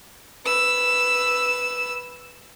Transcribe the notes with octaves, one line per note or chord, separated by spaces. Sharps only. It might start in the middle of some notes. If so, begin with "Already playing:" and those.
B4 E6